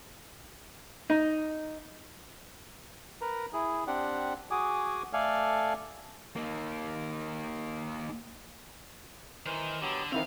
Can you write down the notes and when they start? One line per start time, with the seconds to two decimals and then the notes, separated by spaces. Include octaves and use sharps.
1.10 D#4
3.21 A#4 B4 A#5
3.53 E4 G#4
3.87 C4 D4 G4 F#5
4.51 F#4 G#4 G#5 D6 D#6
5.13 A3 A4 D5 F5 G#5
6.36 A#3 D#4
9.46 D#3 E3 C5
9.82 D3 F#3 B3 G4
10.12 F2 D#3 E3 C4 F5